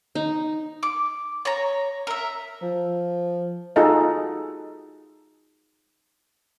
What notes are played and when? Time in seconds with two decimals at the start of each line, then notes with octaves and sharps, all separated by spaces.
0.15 D#4
0.83 D6
1.45 C#5 A#5
2.07 A#4 E5
2.62 F3
3.76 D#4 F4 F#4 G#4 A4 D#5